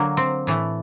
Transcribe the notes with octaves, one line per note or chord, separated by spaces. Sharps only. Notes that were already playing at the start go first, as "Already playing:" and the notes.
Already playing: D3 F#3 A#3
C4
A2 E3 A3